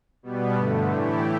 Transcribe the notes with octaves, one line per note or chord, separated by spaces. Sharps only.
B2 G3 B3
G2 D3 A3
A2 E3 A3 E4 G4